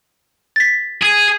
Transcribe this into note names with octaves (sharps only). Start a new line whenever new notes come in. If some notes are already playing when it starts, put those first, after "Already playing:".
A6 B6
G#4